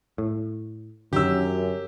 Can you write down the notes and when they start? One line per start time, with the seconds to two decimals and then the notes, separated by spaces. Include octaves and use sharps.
0.18 A2
1.13 F#2 D3 D#3 F#3 G4 E6